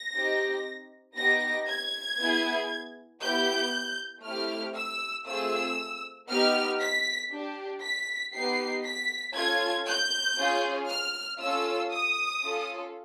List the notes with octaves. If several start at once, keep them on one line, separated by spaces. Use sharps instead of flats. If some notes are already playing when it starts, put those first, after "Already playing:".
Already playing: A#6
C4 D#4 G4
B3 D#4 G4 A#6
G#6
B3 E4 G#4
B3 E4 G4 G6
A3 C4 E4 G4 F6
E6
A3 C4 F4 G#4 E6
B3 D#4 G4 F6
B6
D4 G4
B6
B3 D#4 G4 C7
B6
C#4 F4 A4 G#6
G6
C#4 F4 G#4
F6
C#4 F4 A4 E6
D#6
C#4 F4 A4